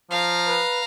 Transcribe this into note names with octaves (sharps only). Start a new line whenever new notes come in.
F3 F5 A#5
B4